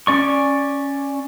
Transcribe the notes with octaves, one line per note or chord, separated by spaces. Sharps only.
C#4 D5 C#6